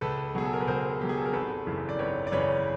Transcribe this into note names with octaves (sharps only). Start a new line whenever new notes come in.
C#2 A4 B4
B2 F#3 G#4
A4
A#4
B4
C#2 A#4 C5
B2 F#3 G4
G#4
A4
A#4
G#1 A4 B4
F#2 C#3 E3
D5
G#1 B4 C#5
D5
F#2 C#3 E3 B4 C#5